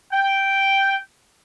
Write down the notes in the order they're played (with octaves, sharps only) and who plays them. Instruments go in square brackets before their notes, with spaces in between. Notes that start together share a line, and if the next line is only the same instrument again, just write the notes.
[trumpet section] G5